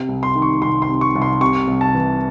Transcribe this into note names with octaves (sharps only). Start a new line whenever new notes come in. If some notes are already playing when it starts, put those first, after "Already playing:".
Already playing: C3
C2
C6
D#3
C#6
C2 C6
C6
C3
C#6
C2
C6
C3 C#6
C2
A5
E3